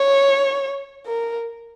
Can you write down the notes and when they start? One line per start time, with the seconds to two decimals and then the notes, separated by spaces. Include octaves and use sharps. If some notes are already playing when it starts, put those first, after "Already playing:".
Already playing: C#5
1.06 A#4